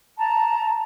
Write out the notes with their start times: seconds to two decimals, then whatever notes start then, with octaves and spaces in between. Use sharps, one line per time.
0.16 A5 A#5